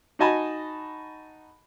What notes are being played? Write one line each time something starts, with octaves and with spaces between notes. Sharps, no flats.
D#4 F#4 D#5 G#5 A5 B5